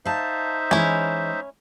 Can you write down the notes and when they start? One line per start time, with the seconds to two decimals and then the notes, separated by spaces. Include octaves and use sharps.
0.05 D#4 C5 E5 F5 A5
0.71 E3 G#3 C#4 E4